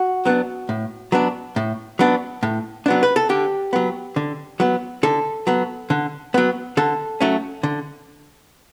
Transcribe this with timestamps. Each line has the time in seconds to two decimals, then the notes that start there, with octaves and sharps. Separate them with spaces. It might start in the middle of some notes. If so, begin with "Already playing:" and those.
Already playing: F#4
0.25 F#3 B3 D4
0.69 A2
1.12 F#3 B3 D4
1.56 A2
1.99 F#3 B3 D4
2.43 A2
2.86 F#3 B3 D4
3.03 B4
3.16 A4
3.29 D3 G4
3.73 F#3 B3
4.16 D3
4.60 F#3 B3
5.03 D3 A4
5.47 F#3 B3
5.90 D3
6.34 F#3 B3
6.77 D3 A4
7.21 F#3 A3 C#4
7.63 D3